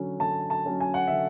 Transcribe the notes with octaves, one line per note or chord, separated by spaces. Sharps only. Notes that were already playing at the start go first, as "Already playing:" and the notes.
Already playing: D3 F#3 C#4
D3 A5
A5
F#3 C#4
G#5
F#5
D3 E5